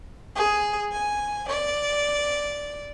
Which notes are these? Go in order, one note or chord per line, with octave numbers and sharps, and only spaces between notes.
G#4
G#5
D5